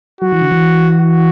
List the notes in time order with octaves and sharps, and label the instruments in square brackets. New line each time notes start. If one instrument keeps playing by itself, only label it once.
[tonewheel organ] F#3 [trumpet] F#4
[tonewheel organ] E3
D3
E3
[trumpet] F#4